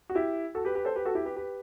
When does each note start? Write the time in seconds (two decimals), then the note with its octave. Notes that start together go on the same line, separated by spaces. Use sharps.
0.09 F#4
0.15 E4 G4
0.55 F#4 A4
0.65 G4 B4
0.75 G4 B4
0.85 A4 C5
0.96 G4 B4
1.05 F#4 A4
1.15 E4 G4
1.25 G4 B4
1.36 G4 B4